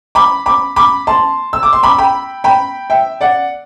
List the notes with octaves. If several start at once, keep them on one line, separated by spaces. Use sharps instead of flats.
B5 D6
B5 D6
B5 D6
A5 C6
E6
D6
C6
B5 D6
G5 B5
G5 B5
E5 G5
D5 F#5